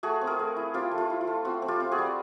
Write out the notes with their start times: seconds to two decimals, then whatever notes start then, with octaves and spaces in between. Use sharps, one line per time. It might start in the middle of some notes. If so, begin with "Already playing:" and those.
0.03 A3 F#4 G#4
0.21 C4
0.27 G#4 A#4
0.39 A3
0.56 E4
0.74 C4 F4 G4
0.91 A3
0.98 F4
1.10 E4
1.21 F4
1.27 A3
1.45 C4 F#4
1.62 C4
1.68 F4 G4
1.80 C4
1.92 F#4 G#4
1.98 G3